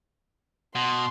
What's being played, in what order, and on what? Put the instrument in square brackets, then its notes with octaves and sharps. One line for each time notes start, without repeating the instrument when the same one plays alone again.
[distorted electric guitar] B2 [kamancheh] C6